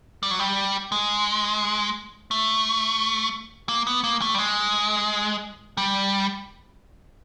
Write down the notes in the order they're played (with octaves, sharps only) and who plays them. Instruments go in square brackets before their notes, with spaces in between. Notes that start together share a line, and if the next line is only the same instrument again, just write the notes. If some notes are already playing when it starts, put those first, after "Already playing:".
[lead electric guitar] G3
F#3
G3
G#3
A3
A#3
B3
A#3
A3
G3
G#3
G3